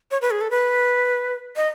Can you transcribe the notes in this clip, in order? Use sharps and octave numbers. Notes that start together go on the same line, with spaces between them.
C#5
B4
G#4
A4
B4
D#5